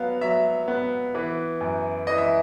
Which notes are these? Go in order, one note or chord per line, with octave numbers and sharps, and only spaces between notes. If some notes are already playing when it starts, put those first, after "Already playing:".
Already playing: F#3 B3 F5
F#3 E5
B3
E3
F#2
E3 D#5
E5